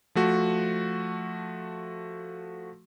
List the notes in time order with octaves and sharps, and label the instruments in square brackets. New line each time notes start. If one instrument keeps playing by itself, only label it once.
[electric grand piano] F3 A3 F#4